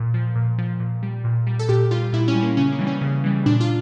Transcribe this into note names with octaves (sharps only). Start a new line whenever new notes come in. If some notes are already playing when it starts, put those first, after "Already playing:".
Already playing: A#2
F3
A#2
F3
A#2
G3
A#2
G3
A4
A#2 G4
G3 F4
A#2 E4
C#4
G3
A#3
C#3 C#4
A#3
E3 G3
C#4
C#3
E3 G3
A#2 D4
F4